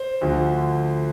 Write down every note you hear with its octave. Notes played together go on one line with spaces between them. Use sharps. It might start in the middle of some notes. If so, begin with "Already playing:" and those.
Already playing: C5
D2 D3 F3